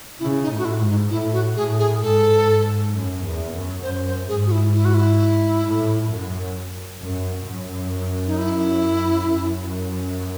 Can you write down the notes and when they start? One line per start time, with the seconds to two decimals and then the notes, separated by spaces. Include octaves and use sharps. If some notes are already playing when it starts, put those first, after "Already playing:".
0.19 C#3 E4
0.42 D#4
0.50 A2
0.58 F#4
0.65 E4
0.80 G#2
0.89 D#4
1.10 A2 E4
1.33 F#4
1.56 A2 G#4
1.79 G#4
2.02 G#2 A4
2.93 F#2
3.23 E2
3.53 F#2
3.83 F#2 C5
4.06 C5
4.28 G#2 G#4
4.46 F#4
4.51 E4
4.74 E4
4.85 F#4
4.94 E4
5.65 A2
6.10 F#2
7.01 F#2
7.47 F#2
8.27 D#4
8.38 E4
9.29 F#2